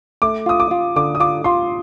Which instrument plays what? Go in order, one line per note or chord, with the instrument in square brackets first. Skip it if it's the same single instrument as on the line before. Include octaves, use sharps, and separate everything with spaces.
[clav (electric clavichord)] A3 [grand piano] D6
[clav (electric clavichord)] F4 [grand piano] D#6
[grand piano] D6
[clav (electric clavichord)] F4
[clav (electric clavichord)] D3 [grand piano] D6
[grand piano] D#6
[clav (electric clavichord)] F4 [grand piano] D6
[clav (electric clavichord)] F4 [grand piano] C6